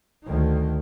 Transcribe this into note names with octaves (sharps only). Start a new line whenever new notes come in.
D2 D#3